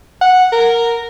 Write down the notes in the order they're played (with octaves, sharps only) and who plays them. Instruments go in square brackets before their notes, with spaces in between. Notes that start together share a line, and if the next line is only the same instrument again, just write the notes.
[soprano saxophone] F#5
A#4